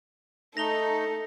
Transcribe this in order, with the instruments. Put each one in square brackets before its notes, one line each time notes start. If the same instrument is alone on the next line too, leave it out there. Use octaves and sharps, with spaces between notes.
[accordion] A3 D#4 [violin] A4 [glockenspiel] A#6 F7 G7